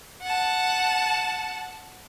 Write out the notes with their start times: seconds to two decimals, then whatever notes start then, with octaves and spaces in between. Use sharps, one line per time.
0.22 F#5 A5